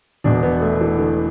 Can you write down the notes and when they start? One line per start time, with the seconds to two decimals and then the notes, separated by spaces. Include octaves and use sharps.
0.24 E1 E2 B2 D4
0.43 B3
0.61 A3
0.81 E3
0.98 D3